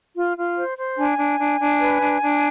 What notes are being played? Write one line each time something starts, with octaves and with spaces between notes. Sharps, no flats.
F4
F4
C5
C5
D4 G#5
D4
D4
D4
B4
D4
D4